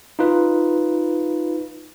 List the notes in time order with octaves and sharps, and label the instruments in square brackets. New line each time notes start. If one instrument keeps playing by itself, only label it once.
[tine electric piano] D#4 F4 B4